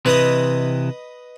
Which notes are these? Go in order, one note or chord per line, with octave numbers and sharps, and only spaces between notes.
C3 E3 B4 D#5